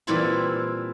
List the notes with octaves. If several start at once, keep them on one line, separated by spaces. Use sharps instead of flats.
A#2 E3 G3 C4 E4 B5